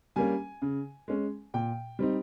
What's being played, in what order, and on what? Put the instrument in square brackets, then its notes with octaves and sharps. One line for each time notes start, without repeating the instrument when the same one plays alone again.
[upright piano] G3 A#3 C#4 G#5
C#3
G#3 C#4
A#2 G5
G3 C4 D#4